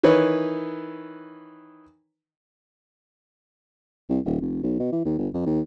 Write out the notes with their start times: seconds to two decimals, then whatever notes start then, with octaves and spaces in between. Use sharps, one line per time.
0.03 D#3 E3 B4 C#5
4.09 C2
4.25 D#1
4.41 F1
4.63 B1
4.80 B2
4.92 E3
5.05 D#2
5.18 G1
5.34 F2
5.46 D#2